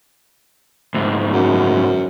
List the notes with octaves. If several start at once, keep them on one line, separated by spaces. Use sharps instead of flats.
D2 G#2
F#2